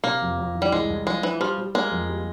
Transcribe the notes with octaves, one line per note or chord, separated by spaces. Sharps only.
C3 A#3
F2
F2
E3
G3
C2 G#3
C2
F3 G#3
E3 F3
F3 G3
G3
G#3 A#3
F2
G3